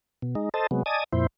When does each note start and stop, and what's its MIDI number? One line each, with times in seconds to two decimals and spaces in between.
0.22 0.35 47
0.35 0.49 56
0.35 0.49 63
0.54 0.67 69
0.54 0.67 72
0.54 0.67 75
0.54 0.67 81
0.71 0.83 48
0.71 0.83 54
0.71 0.83 56
0.71 0.83 59
0.86 1.04 74
0.86 1.04 75
0.86 1.04 80
0.86 1.04 81
0.86 1.04 87
1.13 1.27 41
1.13 1.27 46
1.13 1.27 64
1.13 1.27 72